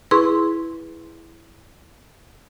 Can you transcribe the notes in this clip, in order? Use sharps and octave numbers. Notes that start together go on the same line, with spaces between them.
E4 G#4 B4 C6 C#6